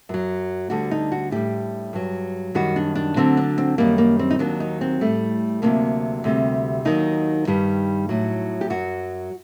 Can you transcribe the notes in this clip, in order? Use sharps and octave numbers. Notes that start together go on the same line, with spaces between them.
F#2 F#3
D2 D3 G3 F#4
D#4
F#4
A2 G3 G4
G2 F#3
F#2 D#3 G3 F#4
D4
D4
D2 D3 F#3 C4
D4
C4
F#2 D#3 G3 A#3
A#3
C4
D#4
D#2 D#3 F#3 D4
D#4
C4
A2 G3 A3
D2 C3 D#3 F#3 A#3
D2 C3 G3
D#2 D#3 F#3 D#4
G2 D#3 G3
A2 F#3
G4
F#2 F#3 F#4